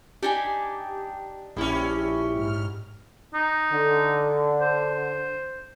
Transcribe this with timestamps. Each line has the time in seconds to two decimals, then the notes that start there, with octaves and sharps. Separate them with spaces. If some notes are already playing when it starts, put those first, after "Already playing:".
0.23 D4 D#4 G4 G#5
1.57 A#1 G3 C#4 E4
2.32 G#2 F6
3.34 D#4
3.71 D3
4.61 C5